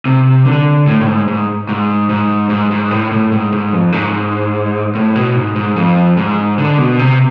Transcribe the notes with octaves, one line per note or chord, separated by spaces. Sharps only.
C3
D3
A2
A2
G#2
G#2
G#2
G#2
G#2
G#2
A2
A2
G#2
G#2
F2
G#2
A2
B2
G#2
G#2
F2
G#2
D3
B2
C3